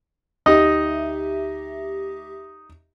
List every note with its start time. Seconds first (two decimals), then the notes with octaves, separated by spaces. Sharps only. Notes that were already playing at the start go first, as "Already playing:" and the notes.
0.46 D2 D#4 G4 D#5 E5